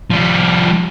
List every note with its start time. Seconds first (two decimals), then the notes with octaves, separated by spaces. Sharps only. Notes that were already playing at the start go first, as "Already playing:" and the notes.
0.10 F3 G3